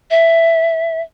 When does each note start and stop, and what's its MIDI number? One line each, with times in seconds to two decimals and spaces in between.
0.11 1.01 76